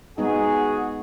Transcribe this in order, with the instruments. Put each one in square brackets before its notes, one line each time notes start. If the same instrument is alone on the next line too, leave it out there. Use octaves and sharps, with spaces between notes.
[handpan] G#3 B3 D#4 [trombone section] F#4 G#4